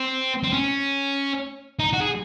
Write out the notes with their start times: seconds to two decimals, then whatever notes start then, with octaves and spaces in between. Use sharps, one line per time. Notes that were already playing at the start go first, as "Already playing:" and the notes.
Already playing: C4
0.44 C4
0.53 C#4
1.79 D#4
1.93 F#4
2.01 G#4